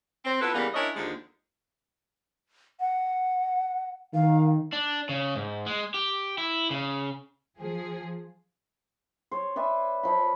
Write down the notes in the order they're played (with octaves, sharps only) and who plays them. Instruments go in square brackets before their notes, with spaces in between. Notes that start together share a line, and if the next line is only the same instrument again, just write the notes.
[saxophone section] C4
B3 E4 F4 A4 B4
C#3 E3 G3 A#3 B3
C#4 D4 E4 A#4 C#5 D#5
D#2 D3 F3 G#3
[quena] F#5
[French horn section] D#3 [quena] F5
[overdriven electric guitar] D4
C#3
G#2
G#3
G4
E4
C#3
[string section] F3 G#4
[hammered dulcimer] C5 C#5
B4 D5 E5 G#5
F3 B5